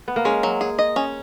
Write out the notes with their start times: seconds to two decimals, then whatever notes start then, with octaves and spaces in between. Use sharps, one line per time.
0.08 B3
0.16 A#3
0.25 G#3 C#4
0.43 F#3
0.61 G#4
0.79 D#5
0.96 C#4